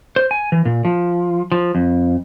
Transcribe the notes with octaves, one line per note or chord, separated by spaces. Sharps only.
C5
G#5
E3
A#2
F3
F3
F2